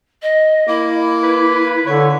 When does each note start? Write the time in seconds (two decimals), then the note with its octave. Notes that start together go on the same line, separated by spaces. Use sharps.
0.22 D#5
0.67 A#3 E4
1.23 B4
1.86 D3 C#5